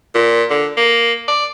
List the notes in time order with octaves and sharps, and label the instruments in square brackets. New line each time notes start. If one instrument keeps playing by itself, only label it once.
[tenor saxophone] A#2
D3
A#3
D5